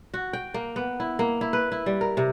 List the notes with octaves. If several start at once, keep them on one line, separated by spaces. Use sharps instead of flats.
F#4
G5
A#3
B3
E4
A#3
E4
B4
E4
G3
A#4
C3